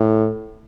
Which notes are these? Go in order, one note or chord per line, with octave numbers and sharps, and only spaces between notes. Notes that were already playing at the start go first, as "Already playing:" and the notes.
Already playing: A2